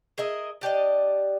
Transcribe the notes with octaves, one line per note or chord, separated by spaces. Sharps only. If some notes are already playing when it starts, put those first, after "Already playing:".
G#4 A#4 D#5 E5
D4 G4 D5 D#5